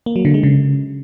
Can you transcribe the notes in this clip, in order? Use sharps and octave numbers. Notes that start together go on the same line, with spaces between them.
A#3
F#3
D3
G#3
C#3